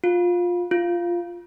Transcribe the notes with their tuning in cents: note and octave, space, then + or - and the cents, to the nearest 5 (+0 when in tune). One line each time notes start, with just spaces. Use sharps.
F4 +15
F4 -5